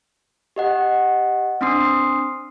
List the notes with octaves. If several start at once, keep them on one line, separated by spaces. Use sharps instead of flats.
G4 D#5 F#5
C4 D4 C6 D#6 C7